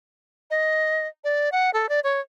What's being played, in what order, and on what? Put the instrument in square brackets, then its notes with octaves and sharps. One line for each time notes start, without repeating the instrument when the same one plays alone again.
[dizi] D#5
D5
F#5
A4
D5
C#5